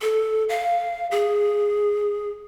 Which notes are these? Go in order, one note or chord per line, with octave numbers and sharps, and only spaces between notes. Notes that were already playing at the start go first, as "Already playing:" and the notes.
A4
F5
G#4